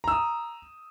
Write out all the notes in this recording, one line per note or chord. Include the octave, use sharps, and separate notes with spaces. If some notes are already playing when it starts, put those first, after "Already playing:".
A#5 D#6 E6